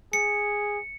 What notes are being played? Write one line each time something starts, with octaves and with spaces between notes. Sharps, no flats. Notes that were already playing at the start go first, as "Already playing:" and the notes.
G#4 C#7